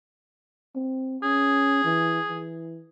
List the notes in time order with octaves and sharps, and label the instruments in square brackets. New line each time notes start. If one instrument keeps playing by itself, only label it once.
[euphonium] C4
[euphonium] C#4 [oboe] G#4
[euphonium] E3
E3